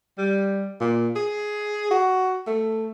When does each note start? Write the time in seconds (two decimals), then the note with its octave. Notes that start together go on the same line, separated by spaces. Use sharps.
0.18 G3
0.81 A#2
1.16 G#4
1.91 F#4
2.47 A3